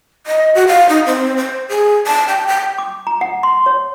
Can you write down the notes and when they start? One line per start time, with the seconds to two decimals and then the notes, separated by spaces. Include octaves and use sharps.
0.27 D#5
0.55 F#4
0.68 F5
0.89 D#4
1.06 C4
1.37 C5
1.69 G#4
2.07 A5
2.28 G5
2.47 G5
2.78 D6
3.07 A#5
3.21 F#5
3.43 C6
3.66 C#5